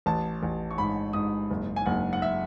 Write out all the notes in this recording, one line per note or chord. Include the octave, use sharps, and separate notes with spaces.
A1 A5
A1
C#6
G#2 B5
G#2 D#6
F#1
G#5
F#1 F#5
F#5
E5